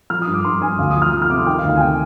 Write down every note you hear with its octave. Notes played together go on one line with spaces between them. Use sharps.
F3 F6
D#6
G2
D6
G2 C6
G2 G#5
D2 F5
D#6
F3
F6
F3 D#6
F6
C3 D6
C6
D#3 G5
F5
D2
F5
G#5
C3 G5